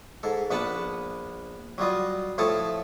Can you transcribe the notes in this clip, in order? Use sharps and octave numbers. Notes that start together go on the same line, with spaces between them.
G#2 A4
A#1 B3 B4 F#5 A5 B5
F#3 G3 F4 D#5
A2 F3 A4 C#5 A5 D#6